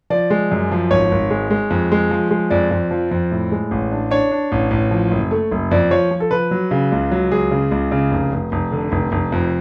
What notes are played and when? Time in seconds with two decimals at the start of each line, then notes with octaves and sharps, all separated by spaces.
0.10 F3 D5
0.30 G#3
0.51 F#2
0.71 F3
0.91 G#1 C#5
1.12 G#1
1.30 G#3
1.50 G#3
1.70 F2
1.92 G#3
2.11 F3
2.31 G#3
2.50 F2 D5
2.71 F2
2.91 F3
3.11 F2
3.31 A2
3.52 G#3
3.71 A1
3.91 D4
4.11 D4 C#5
4.31 D4
4.52 A1
4.71 A1
4.91 F3
5.11 F#1
5.31 A3
5.51 F#1
5.71 F2 D5
5.91 F3 C#5
6.11 F3
6.20 A4
6.31 F3 B4
6.51 F#3
6.71 C#3
6.92 C#2
7.11 F#3
7.32 C#2 G#4
7.51 C#3
7.72 C#2
7.92 C#3
8.11 F1
8.32 F1
8.52 F1
8.72 D3
8.92 F1
9.12 F1
9.32 F2